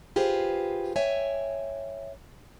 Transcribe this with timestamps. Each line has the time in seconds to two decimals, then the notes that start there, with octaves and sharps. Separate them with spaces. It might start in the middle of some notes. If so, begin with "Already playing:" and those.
0.16 F4 G4 G#4 B4 C5
0.96 C#5 E5 G5 G#5